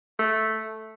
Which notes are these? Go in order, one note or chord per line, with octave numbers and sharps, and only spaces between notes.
A3